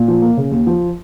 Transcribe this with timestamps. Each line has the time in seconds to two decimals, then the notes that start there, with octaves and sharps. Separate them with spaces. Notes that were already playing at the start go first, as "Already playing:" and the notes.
Already playing: A#2
0.08 F3
0.22 A#3
0.37 C#3
0.52 D#2
0.67 F3